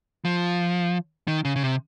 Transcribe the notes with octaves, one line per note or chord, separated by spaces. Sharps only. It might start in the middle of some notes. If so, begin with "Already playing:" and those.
F3
D#3
C#3
C#3
C3